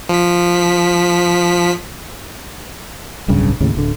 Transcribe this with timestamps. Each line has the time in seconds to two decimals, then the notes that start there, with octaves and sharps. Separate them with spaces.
0.09 F3 B6
3.28 D1 B1 G2 C#3
3.60 D#2 A2 C#3
3.75 D1 D3